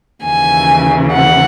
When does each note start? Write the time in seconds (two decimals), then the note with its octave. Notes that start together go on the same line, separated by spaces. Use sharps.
0.24 D#2 C#3 E3 G#5
1.12 F#5